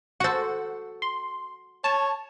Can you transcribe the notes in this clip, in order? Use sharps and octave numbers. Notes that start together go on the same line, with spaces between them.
F#4 A4 C5 F#5
C6
C#5 A5